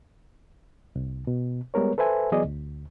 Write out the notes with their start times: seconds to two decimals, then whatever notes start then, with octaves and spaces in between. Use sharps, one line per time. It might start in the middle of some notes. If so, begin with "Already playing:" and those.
0.96 C2
1.27 B2
1.74 G3 G#3 B3 A#4 C#5
1.98 A4 B4 C5 E5 G#5
2.32 E3 F#3 B3 G#4 D5 D#5
2.44 D2